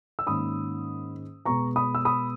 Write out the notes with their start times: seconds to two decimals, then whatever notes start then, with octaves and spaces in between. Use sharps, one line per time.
0.19 E6
0.27 G#2 D#3 A#3 C#4 B5 D#6
1.45 B2 G#3 B3 A#5 C#6
1.76 B5 D#6
1.95 E6
2.05 B5 D#6